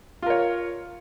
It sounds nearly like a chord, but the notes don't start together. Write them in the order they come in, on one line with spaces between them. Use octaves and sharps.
F4 A#4 C#5